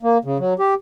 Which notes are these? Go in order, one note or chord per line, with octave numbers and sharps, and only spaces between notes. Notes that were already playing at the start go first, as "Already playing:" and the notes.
A#3
C#3
F#3
G4